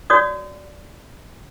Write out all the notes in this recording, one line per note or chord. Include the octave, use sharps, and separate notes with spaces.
F#4 C#5 D5 D#6